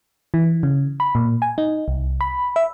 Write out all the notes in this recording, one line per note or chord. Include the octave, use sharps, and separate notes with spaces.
E3
C#3
B5
A#2
G#5
D#4
C2
B5
E5